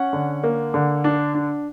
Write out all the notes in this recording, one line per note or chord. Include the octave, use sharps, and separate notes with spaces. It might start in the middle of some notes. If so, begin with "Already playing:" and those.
Already playing: C#4 F#5
D3
A#3
D3
D4
D4